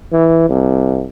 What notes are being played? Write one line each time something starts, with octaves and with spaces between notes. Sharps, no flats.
E3
C2